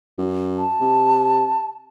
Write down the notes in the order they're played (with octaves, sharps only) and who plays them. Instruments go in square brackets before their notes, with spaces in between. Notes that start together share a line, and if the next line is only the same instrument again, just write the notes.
[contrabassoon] F#2
[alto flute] A5
[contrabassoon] C3